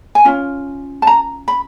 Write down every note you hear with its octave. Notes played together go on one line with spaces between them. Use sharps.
G#5
C#4 F4
A5
A#5
B5